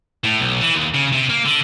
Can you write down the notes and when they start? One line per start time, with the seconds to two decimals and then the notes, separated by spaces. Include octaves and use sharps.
0.24 A2
0.40 B1
0.62 E3
0.75 D#2
0.95 C#3
1.13 C3
1.30 A#3
1.45 D3